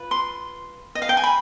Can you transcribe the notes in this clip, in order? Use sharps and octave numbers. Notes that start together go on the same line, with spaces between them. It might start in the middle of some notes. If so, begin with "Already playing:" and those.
Already playing: F4 B4
C6
D#5
F5
G5
G#5
B5